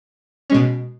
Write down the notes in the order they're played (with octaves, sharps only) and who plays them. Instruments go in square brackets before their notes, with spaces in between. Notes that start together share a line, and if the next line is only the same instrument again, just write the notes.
[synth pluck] B2 G#3 C#4